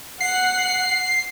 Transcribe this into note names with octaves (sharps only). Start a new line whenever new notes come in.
F#5 C7